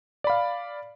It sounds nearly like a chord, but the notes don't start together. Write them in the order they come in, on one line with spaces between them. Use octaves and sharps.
D5 B5 F5